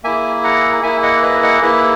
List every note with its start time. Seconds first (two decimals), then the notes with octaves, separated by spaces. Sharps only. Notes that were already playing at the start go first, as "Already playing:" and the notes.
0.04 A#3 E4 G#4 E5 G#5
0.44 F#5 A#5
0.83 A#3 E4 G#4 E5 G#5
1.03 D#5 F#5
1.23 B4 D#5
1.43 D#5 F#5
1.62 A#3 E4 G#4 B4